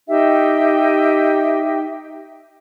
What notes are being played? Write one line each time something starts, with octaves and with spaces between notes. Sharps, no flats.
D#4 G4 E5 G5